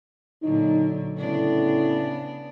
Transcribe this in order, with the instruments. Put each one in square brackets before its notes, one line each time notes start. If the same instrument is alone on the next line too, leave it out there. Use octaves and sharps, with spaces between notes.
[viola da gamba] A#2 D3 F#3 [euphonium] D#4
[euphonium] A2 [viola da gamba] C#3 B3 D4